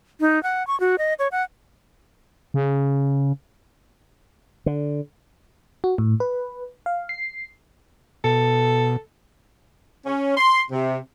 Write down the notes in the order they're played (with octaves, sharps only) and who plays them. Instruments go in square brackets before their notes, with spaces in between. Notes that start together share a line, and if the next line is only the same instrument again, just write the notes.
[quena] D#4
F#5
C#6
F#4
D#5
C#5
F#5
[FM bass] C#3
[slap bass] D3
[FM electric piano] F#4
A2
B4
F5
C7
[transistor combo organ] B2 [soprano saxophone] A4
[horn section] C#4
C6
C3